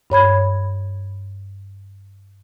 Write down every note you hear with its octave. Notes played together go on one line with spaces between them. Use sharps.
G2 C#5 B5 G#6